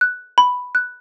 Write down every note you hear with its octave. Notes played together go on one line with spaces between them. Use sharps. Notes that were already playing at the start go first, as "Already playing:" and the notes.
F#6
B5
F#6